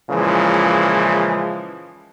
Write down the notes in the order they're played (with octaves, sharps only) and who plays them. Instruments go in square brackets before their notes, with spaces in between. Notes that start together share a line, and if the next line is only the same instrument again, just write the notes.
[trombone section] A#2 C#3 E3 F3 G#3